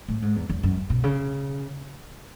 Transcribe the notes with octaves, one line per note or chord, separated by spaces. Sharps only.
A2
G#2
E2
E2
F#2
B2
C#3